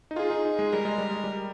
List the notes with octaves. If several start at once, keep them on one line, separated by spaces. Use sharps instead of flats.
D#4
F4 G#4
D#4
D#4
G#3
G3 A#4
G#3
G3
G#3
G3